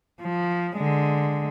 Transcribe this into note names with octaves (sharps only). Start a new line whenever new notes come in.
F3
D3 G#3